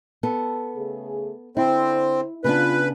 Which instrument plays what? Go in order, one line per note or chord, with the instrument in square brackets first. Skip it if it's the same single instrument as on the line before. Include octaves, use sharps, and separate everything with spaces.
[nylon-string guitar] B3 A4
[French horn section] C#3 A3 G#4
[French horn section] D3 C5 [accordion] C4 [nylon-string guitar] E4
[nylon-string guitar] C#3 B3 D4 [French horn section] F4 [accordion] B4